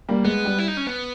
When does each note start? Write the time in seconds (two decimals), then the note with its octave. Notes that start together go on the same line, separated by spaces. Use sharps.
0.09 G3 A#3
0.25 G#3 B3
0.45 G3
0.58 E4
0.68 D#4
0.77 C#4
0.87 B3